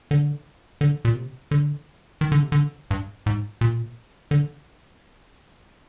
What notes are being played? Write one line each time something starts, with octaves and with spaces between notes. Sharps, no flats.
D3
D3
A#2
C3
D3
D#3
D3
C3
D3
G2
G#2
A#2
D3